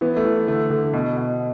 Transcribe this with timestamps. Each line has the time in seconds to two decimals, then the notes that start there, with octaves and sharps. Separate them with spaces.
0.01 E3 B3
0.17 A3
0.25 E3
0.47 D3 A3
0.70 D3
0.93 B2
1.17 B2